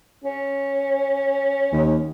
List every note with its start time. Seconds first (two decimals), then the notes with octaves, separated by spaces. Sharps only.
0.24 C#4
1.72 D#2